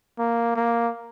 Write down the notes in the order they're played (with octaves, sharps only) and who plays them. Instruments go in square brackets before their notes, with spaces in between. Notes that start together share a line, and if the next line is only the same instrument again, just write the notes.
[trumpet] A#3
A#3